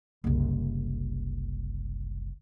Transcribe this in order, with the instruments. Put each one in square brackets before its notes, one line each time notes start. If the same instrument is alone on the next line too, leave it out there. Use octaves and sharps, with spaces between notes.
[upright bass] F#1 C2